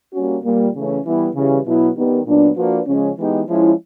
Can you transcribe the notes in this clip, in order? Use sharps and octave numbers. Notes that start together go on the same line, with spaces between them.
G3 A#3 C#4 F#4
A#2 G3 A#3
C#3 E3 A3 C#4
E3 G3 B3 E4
C#3 E3 G3
B2 F#3 B3 E4
D#3 G3 B3
A#2 F#3 B3 D4
F3 A#3 D4 F#4 B4
C#3 F3 G#3 C#4
E3 G#3 B3 D#4 G4
F3 G#3 C#4 E4